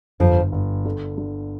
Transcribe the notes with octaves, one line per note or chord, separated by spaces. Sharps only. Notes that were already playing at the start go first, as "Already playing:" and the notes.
G1 F2 F3
G1
D3
D3